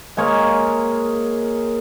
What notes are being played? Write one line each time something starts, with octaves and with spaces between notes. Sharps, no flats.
G#3 A#3 C#5 F5